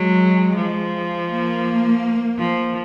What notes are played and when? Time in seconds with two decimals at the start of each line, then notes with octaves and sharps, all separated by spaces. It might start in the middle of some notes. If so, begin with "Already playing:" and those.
Already playing: F#3 G#3
0.55 F3
1.29 A#3
2.38 F3